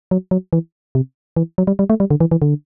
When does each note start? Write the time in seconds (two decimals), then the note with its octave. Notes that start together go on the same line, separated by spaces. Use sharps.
0.11 F#3
0.31 F#3
0.53 E3
0.95 C3
1.37 E3
1.58 F#3
1.67 G3
1.79 G3
1.90 A3
2.00 G3
2.11 D3
2.20 E3
2.31 E3
2.42 D3